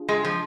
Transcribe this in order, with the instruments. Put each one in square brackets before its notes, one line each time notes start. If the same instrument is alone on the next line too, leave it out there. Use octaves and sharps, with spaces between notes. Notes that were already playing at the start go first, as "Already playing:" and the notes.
Already playing: [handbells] D4 F4 G#4
[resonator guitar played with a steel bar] G#3
F3